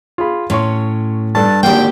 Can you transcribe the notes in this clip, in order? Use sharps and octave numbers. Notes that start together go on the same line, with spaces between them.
F4 G#4 B5
A2 C#4 C#5 C6 C#6
G2 D4 A4 A5
G#1 D3 A#3 G4 F#5 G5